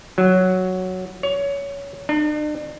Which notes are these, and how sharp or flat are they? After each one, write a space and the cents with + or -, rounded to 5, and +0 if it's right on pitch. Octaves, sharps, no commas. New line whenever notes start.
F#3 +0
C#5 +20
D4 +45